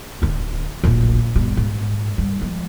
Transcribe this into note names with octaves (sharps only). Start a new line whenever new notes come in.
D1 D3
D1 A#1
G1 G3
G#2
G3
F3 G#3